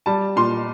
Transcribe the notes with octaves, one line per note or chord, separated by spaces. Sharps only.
G3 A5
A#2 C6